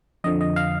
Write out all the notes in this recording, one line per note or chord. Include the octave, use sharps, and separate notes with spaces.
F2 D3 F3 D#5
D#5
F5